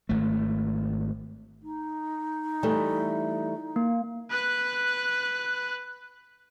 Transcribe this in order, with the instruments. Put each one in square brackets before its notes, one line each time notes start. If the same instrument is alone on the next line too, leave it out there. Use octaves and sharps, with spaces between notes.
[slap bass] G#1 A3
[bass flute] D#4
[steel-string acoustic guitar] E3 G3 A3
[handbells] A#3
[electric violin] B4 F#6